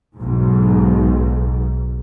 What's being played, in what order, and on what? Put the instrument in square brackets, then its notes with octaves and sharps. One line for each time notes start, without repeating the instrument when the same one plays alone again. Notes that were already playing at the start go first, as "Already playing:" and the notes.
[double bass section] B1 G#2